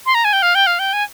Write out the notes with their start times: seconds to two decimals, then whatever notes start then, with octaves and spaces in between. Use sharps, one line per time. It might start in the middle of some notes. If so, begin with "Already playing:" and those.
0.06 C6
0.15 A#5
0.25 G#5
0.33 G5
0.42 F5
0.55 G5
0.67 F5
0.79 G5
0.93 G#5